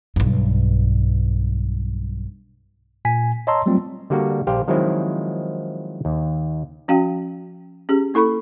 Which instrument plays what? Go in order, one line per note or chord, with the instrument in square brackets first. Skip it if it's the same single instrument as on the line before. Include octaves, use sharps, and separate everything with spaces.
[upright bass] B1 G2
[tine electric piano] A#2 G#5 B6
C#5 D#5 A5 A#5 C6 E6
F#3 G3 A3 C4 F4
[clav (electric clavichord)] D3 G3 A#3 F#4
A#1 G4 C5 F5 G5
D#3 F3 F#3 G#3 C4 E4
D#2
[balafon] F3 C#4 F#4 F5 G5
C#4 G4 G#4
A#3 E4 A4 B5 C#6